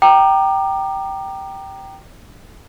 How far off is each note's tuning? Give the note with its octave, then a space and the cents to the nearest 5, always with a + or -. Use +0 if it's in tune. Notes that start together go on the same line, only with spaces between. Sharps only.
G5 -10 A#5 +5 D6 +35